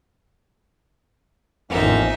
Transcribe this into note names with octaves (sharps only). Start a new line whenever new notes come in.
A1 F2 A#3 B3 C#4 D#4 E5